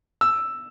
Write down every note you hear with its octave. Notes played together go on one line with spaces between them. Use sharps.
E6